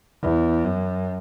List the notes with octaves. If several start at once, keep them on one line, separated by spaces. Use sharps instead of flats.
E2
F#2